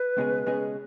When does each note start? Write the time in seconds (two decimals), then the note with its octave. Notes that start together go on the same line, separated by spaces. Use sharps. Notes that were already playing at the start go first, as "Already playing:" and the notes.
Already playing: B4
0.17 C#2 B2 G#3 C#4 G#4
0.46 C#2 B2 G#3 C#4 G#4